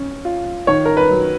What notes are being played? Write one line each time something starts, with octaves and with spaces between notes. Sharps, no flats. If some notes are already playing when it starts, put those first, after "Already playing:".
Already playing: C#4
F4
D#3 C#5
A#4
B4
F#3